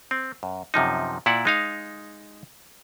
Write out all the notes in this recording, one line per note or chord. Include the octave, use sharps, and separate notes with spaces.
C4
F#2
F#2 C3 F3 D#4
A#2 E4 D5 F#5
G#3 D#4 F5